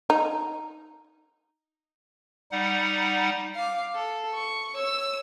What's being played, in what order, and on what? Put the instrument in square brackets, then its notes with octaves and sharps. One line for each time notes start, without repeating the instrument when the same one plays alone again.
[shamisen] D#4
[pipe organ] G3 D#4 F#5
[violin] F5 D6
A4
C#6
C#5 E6